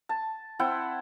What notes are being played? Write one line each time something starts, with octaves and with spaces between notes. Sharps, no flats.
A5
C4 E4 F#5 G5